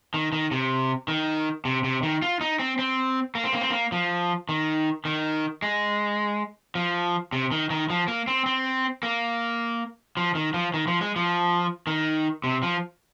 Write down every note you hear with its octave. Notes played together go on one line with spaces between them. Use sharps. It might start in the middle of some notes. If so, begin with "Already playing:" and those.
D#3
D#3
C3
D#3
C3
C3
D#3
F4
D#4
C4
C4
A#3
C4
A#3
C4
A#3
F3
D#3
D#3
G#3
F3
C3
D#3
D#3
F3
A#3
C4
C4
A#3
F3
D#3
F3
D#3
F3
G#3
F3
D#3
C3
F3